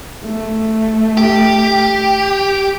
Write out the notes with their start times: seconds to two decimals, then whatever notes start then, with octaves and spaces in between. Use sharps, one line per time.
0.24 A3
1.17 G4